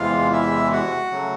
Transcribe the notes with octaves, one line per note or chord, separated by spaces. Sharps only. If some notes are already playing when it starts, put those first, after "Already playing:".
Already playing: E2 C3 E3 G#3 F4 F5
E4 E5
F#4 F#5
C#3 F#3 A3